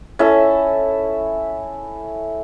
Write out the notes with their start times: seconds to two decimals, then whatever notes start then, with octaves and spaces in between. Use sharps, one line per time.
0.19 C#4 E4 A4 E5